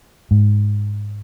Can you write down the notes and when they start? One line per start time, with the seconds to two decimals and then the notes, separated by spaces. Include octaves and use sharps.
0.31 G#2